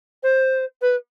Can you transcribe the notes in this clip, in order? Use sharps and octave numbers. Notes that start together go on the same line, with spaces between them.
C5
B4